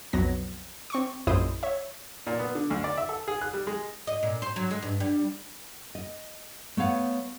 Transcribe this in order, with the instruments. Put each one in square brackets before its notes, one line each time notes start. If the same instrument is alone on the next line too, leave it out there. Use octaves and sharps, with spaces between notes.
[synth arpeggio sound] B1 F2 F#3 B3 A#6
C4 C#6 D6
A#1 F#2 G#3 E4 C5 D#6
C#5 E5
[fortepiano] A#2
B3
D3
D2
D5
E5
A4
G#4
F#6
G3
G#3
[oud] D#5
A#2
C5
F#3
G#3
G2
G3
[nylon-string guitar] D#5
A3 B3 C#5 F5 F#5